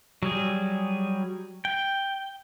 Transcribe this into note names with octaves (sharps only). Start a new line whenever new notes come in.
F#3 G3 G#4
G5